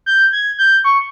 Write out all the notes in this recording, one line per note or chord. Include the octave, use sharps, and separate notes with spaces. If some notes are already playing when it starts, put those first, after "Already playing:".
G6
G#6
G6
C#6